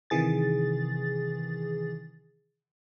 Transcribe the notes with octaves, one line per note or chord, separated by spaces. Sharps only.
C3 D#3 E3 G#4 A6